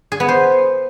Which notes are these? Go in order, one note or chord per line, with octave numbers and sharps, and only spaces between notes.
G#4
B3
C5